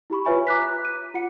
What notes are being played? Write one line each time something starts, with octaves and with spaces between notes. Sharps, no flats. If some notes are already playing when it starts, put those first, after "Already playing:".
E4 G4 B5 C#6
F4 B4 C#5 E5 G#5 B5
A#5 D6 F#6 B6
F#6
D#7
F4 F#5 C#7